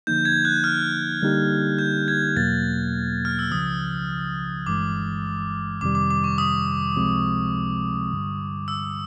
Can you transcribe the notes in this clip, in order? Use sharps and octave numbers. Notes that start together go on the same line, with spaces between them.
D3 F3 A#3 D#4 G6
G#6
F#6
F6
D3 G3 A#3 D#4 G4
G6
G#6
E2 B2 F#3 A#3 A6
F6
E6
C#2 C#3 F3 D#6
G1 G2 E3 G#3 D6
F2 C3 D#3 G3 D6
D6
D6
C#6
D#6
C#2 C3 F3 G#3 C4
G2 D3 G3
E6